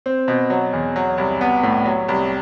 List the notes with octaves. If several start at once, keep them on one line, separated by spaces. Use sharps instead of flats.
C4
B2
F#3
E2
F#3
C2
B3
A2
F#3
C2